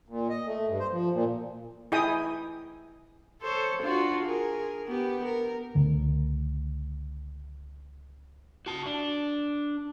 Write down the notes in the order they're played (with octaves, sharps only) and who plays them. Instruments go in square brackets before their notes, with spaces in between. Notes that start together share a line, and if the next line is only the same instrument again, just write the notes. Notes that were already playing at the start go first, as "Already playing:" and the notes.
[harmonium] A#2
D#5
A3
G2
C5
F3
A#2
[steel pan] E4 G#4 D#5 G5 G#5 D#6
[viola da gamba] A4 C5 C#5
D4 F4 F#4
G#4 A#4
B3 G4
A#4
[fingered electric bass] C#2 D3 A3
[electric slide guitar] F#4 A5
D4